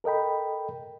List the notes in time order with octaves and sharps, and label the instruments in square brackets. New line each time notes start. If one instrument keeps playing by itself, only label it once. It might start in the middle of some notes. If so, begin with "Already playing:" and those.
[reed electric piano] A4 A#4 D#5 G5 B5